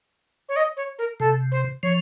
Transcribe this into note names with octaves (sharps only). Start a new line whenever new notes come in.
C#5
D#5
C#5
A#4
C3 A4
C5
F3 C#5